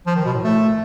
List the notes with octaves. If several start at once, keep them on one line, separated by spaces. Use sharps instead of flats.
F3
D#3
B2
A2
A3